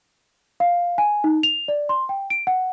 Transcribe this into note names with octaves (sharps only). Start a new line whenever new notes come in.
F5
G#5
D#4
F7
D5
C6
G5
D7
F#5